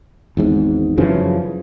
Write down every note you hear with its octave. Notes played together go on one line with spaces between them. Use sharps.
G#1 E2 G#2
F#2 C#3 E3 F3